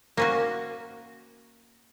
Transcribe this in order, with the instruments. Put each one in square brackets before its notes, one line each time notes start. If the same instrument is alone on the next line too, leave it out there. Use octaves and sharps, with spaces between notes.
[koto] A#3 C#4 F#4